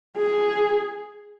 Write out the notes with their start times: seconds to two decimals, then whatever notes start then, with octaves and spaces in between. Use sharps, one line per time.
0.17 G#4